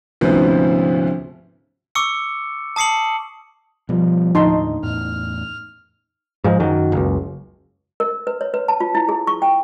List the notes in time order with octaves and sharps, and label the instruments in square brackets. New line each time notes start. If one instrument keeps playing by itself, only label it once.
[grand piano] D2 G#2 C3 F3 B3 C#4
[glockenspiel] C#6 D6 E6 C#7
A5 D#6 C7 C#7 F#7
[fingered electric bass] B2 G3 [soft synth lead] F3
[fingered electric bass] D#2 A2 D3 [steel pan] D#4 A5 C6
[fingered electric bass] E2 A2 [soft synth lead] F6
[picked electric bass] G#2 F3 G#3
F#2 D#3 F#3
F#1 C#2
[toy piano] A#4
B4
C#5
B4
A5
F4
E4
G#4
C#6
G5